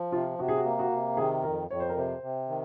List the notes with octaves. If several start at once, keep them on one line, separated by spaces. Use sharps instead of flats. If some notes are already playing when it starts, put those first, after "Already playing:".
Already playing: F3
C3 F4
C3 F#4
G#4
F#4
A#3
F#4
C3
D#3 G#4
F2 A#4
F2 C#5
C5
A#4
C3 C5
C3
D#3